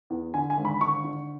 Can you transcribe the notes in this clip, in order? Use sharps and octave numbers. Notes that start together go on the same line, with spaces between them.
E2
D3 G#5
G#5
G#1
B5
D3 C#6
D3